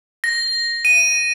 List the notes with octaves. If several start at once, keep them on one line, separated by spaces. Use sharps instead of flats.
A#6
D#7